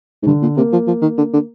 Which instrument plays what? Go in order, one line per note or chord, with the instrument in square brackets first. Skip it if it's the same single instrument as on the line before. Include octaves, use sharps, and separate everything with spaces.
[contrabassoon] G#2
[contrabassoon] G2 [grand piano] D3
[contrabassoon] A#2
[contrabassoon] C3 [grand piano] A#3
[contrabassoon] F3
F3
D#3
D3
D3